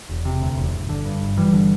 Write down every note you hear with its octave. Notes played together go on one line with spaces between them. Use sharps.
E1
C3
D2
E1
G1
D3
G2
G1
G1 E3 G3
D3